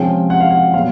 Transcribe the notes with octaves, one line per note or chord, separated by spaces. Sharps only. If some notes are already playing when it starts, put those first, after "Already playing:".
Already playing: C3 F3 G#3 C#4 G5
F#5
F5
F#5
A#2 F#3 B3 F5